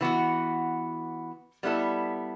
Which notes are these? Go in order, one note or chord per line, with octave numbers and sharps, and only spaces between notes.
E3 B3 F#4
G3 B3 E4 A4